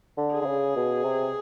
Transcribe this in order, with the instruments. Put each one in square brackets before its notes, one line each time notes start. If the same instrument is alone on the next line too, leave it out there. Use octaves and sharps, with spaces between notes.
[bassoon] D3
[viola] G#4
[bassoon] D3
C#3
B2
C3